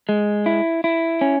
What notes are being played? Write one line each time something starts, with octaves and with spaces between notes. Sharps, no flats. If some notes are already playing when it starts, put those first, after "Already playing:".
G#3
E4
E4
C#4